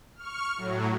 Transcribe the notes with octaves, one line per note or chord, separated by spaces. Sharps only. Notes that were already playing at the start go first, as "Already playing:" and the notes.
C#6 F6
A2 F#3